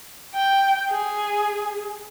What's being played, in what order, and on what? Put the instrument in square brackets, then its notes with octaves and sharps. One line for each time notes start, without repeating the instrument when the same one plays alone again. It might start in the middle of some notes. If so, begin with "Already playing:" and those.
[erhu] G5
G#4